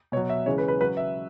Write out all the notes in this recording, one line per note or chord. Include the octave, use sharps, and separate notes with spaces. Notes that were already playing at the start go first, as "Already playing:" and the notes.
B2 F#3 C#5
E5
C#3 E3 G#3 C#5
B4
B4
C#3 F#3 B4
E5